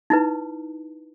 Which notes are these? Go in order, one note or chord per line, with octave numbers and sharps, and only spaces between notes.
D#4 E4 B4